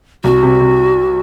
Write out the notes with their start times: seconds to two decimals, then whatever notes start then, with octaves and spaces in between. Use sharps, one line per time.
0.24 C2 F#4
0.43 C3
0.61 C3